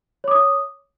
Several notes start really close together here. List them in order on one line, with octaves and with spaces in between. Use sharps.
C#5 D6 D#6